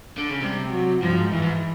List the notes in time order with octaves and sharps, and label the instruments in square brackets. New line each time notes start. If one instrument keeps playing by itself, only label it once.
[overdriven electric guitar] D3
C#3
[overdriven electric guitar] C3 [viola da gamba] G3
[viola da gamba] F#3
[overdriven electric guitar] G2 [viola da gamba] F3
[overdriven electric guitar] G#2
[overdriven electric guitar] G2 [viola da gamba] E3
[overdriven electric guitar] G#2